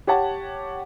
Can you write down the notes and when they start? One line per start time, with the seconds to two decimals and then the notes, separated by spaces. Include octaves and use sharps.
0.07 G4 C#5 F#5 A5